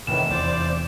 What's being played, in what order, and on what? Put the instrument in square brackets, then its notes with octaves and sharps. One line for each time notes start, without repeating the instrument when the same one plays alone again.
[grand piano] F1 [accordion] A2 D#3 E3 [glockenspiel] E7
[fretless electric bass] E2 [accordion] C5 D5 D6